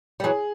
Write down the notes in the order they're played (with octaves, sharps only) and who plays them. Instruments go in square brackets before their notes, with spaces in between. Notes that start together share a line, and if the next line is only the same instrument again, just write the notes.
[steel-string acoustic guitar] G3
[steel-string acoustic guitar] E3 F#3 [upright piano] G#4